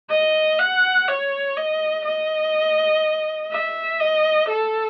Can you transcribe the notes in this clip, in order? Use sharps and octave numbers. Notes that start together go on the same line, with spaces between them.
D#5
F#5
C#5
D#5
D#5
E5
D#5
A4